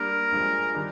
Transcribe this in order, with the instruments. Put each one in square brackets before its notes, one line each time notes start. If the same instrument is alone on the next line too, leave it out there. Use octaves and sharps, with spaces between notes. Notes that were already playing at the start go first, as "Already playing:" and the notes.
Already playing: [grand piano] G3 A#3 D4 [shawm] A#4
[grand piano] G2 F3 G#3 D4 G#4
D#3 G3 D4